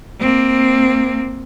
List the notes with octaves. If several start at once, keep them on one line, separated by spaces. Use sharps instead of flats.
A#3 C4